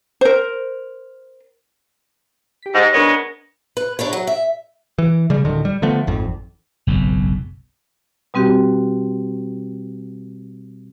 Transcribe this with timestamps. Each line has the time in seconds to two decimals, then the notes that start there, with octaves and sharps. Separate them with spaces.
0.21 A#4 C5
2.63 G4 B6
2.75 G#2 A#6
2.93 C#3 G#3 B3 D4 A#4 C#5
3.77 B4
3.99 D#2 D4 B4 C#5
4.13 F#3
4.27 E5
4.98 E3
5.30 C#3 G3
5.45 D1 D3 D#3
5.65 G3
5.82 D3 F3 A3 B3
6.07 G#1 F2
6.87 F#1 B1 F2 G#2
8.34 B2 G3 C4 F#4 G4